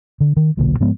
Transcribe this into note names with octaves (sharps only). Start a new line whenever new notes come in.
D3
D#3
D#1 B1 A#2 D3
G#2 F3 G#3 B3